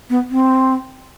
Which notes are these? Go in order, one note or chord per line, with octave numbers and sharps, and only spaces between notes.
B3
C4